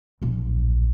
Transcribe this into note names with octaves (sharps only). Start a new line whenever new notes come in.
D1 A#1